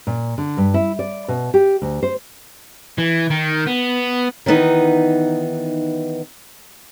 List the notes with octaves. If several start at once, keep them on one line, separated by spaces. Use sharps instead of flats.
A#2
D3
G2
E4
D5
B2
G4
D2
C5
E3
D#3
B3
D#3 E3 B3 D#4